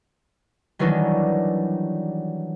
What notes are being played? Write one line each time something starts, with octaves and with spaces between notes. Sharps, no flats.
D#3 E3 F#3 G3 D4 D#4